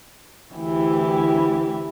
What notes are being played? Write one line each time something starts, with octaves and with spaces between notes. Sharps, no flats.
D2 E3 E4 G4